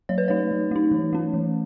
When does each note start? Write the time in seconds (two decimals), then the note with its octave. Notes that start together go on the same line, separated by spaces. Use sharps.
0.09 F#3 C#5
0.18 B4
0.28 A3 D#4 C#5
0.51 F#3
0.71 A3 D#4
0.91 E3
1.13 A3 C#4
1.34 E3